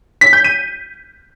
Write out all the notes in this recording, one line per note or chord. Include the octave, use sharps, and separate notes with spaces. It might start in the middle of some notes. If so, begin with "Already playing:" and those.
B6
G6
D#7